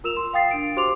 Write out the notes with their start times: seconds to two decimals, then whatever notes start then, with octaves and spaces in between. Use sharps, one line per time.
0.04 F4 A#4 E6 E7 F7
0.17 C6
0.33 F5 G5 D#6 A6 C7
0.51 D4 D7
0.76 F#4 G4 C5 C6 D6 F7